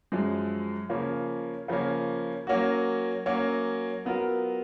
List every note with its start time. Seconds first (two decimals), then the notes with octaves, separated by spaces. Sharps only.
0.12 F#2 F3 G#3
0.90 C#3 F3 A#3 C#4
1.68 C#3 F3 A#3 C#4
2.47 F#3 A#3 C#4 F#4
3.26 F#3 A#3 C#4 F#4
4.05 F#3 B3 F4 A#4